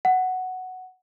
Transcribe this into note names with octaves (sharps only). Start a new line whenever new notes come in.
F#5